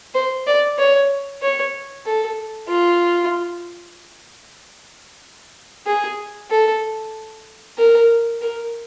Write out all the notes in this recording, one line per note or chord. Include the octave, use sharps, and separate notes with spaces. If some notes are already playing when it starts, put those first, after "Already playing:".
C5
D5
C#5
C#5
A4
F4
G#4
A4
A#4
A#4